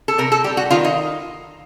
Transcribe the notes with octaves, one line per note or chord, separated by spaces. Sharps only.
A4
C3 A#4
A4
G3 G4
F#4
D#3 F4
D#4